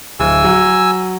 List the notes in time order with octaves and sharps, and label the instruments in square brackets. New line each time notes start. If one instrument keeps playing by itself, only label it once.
[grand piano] D1 [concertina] G#5 E6
[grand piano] F#3